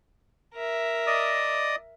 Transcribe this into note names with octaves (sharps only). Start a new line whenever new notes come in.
A#4 E5
D5 D#5 D#6